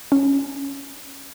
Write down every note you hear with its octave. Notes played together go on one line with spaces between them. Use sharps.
C#4